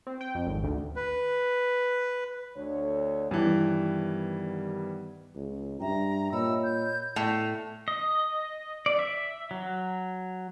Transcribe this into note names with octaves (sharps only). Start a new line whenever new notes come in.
C4
G5
F2
G#1
D2
B4
D2 D3 C#5
G2 D#3 E3 G3 B3
C#2
G2 E5 G5 A#5
A#2 C#5 D#5 B5 E6
G6
A2
D#5
D5
E5
F#3